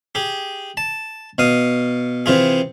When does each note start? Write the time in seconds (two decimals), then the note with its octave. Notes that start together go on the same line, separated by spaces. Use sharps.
0.15 G4 G#4
0.77 A5
1.38 B2 F5 D#6
2.26 C3 E3 F4 G#4